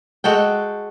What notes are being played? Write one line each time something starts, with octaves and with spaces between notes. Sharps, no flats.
G#3 F#4 A4 G5